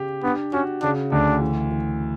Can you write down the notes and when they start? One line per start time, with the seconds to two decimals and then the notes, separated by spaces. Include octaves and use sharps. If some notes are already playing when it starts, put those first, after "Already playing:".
Already playing: C#3 G4
0.23 B3 D4
0.53 C#4 F#4
0.82 C#3 D4
1.12 D2 D4
1.41 E3
1.71 E3